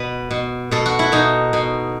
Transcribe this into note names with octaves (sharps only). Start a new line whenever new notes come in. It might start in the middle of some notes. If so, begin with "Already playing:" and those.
Already playing: B2 B4
B2
B2 A4
F#4
E4
B2 D#4
B2